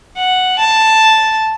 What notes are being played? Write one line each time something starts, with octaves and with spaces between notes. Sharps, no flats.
F#5
A5